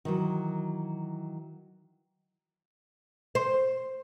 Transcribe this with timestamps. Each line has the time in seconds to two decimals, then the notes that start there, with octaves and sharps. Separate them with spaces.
0.05 D#3 E3 F#3
3.35 C5